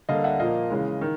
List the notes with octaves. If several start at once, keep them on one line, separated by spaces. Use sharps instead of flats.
D3 G3 A#3 D#5 F5
E5 F#5
A#2 F3 A#3 D#5 F5
C#3 E3 G#3
D#3